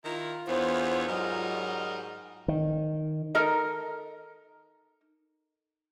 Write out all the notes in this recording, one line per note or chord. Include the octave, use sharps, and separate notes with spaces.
D#3 E4 F4 A#5
E2 D3 B3 C5 C#5
G#2 F#3 G3 A#4 D#5
D#3
D#4 A4 A#4 D#5